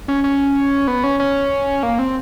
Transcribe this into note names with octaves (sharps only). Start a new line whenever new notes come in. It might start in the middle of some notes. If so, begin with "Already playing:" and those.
C#4
C#4
B3
C#4
C#4
A#3
C4